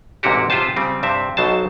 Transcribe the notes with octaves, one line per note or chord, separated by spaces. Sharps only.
A1 G#2 C3 A#3 F#4 G4
C3 F4 G#4 B4 C5 A5
C#3 G3 C4
G2 C3 C4 E5
B1 B2 F#3 C5 A5